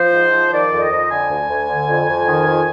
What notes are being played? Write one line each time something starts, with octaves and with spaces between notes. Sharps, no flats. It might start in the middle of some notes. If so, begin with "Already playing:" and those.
Already playing: F3 C5
G#2
F3
D#3 D5
F2
D#5
F2
D3 G#5
D2
D2
D3
F2
F2
D#3
F2